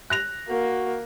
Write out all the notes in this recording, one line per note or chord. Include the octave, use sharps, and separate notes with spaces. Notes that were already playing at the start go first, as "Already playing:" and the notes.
F#6 A#6 F7
A#3 F#4